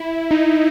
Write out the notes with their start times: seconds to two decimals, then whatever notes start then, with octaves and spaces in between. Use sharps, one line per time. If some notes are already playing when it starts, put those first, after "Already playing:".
Already playing: E4
0.31 D#4